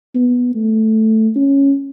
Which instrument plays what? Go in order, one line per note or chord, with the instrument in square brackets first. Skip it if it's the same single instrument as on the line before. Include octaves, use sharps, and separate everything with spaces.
[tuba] B3
A3
C#4